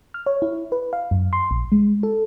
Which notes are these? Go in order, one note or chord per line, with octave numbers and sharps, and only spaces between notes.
F6
C#5
E4
B4
F5
F#2
C6
A#1
G#3
A4